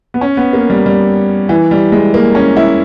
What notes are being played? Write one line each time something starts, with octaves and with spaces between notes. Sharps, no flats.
B3
C#4
B3
A#3
G3
G3
E3
G3
G#3
A#3
C#4
E4